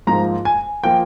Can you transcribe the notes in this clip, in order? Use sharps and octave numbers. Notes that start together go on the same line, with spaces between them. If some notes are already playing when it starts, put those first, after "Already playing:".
G#2 F3 A#3 A#5
G#5
F3 A#3 G5